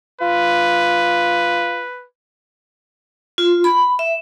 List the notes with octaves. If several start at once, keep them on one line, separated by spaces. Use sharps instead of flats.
F4 B4
F4
B5
E5